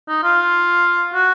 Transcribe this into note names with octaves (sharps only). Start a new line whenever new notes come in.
D#4
F4
F#4